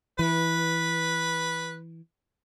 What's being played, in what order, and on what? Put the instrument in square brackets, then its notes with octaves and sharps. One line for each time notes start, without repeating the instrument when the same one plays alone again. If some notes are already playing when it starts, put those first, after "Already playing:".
[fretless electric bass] E3 [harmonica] B4